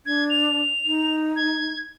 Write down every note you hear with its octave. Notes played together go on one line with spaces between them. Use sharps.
D4 G#6
F7
D#4
G#6